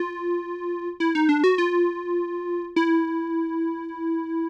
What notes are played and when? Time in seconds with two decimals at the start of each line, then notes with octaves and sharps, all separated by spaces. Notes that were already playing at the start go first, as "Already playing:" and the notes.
Already playing: F4
1.00 E4
1.15 D#4
1.29 D4
1.44 F#4
1.58 F4
2.76 E4